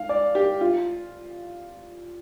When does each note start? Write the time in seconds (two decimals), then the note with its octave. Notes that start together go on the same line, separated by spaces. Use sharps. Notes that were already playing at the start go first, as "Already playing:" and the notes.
Already playing: F5
0.09 D5
0.35 G4
0.61 F4